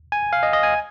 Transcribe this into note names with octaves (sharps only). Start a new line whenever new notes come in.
G#5
F5
D#5
D#5
G#5